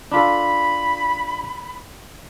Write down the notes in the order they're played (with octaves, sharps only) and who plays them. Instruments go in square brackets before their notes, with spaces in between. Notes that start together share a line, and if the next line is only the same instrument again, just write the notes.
[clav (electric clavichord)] D4 F4 A4 [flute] B5